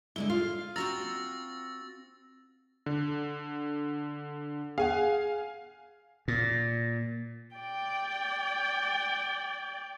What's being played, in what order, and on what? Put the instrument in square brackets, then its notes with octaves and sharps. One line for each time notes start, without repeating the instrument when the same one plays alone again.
[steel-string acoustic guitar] D3 G#3 E4 [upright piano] G7
[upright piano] F4 [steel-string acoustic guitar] F5
[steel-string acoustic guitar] C4 F#4 A#5 [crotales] E6 A6 A#6
[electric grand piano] D3
[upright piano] G#4 F#5 [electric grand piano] F5 G#5
[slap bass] A#2
[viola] D5 G5